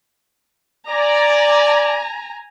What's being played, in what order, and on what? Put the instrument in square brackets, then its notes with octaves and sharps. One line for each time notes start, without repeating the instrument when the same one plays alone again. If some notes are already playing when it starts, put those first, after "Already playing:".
[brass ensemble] D5 [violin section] G#5 A#5